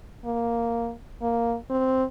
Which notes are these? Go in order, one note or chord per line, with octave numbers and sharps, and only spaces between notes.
A#3
A#3
C4